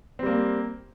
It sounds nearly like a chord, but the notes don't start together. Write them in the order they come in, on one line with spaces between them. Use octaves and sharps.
C4 G3 A#3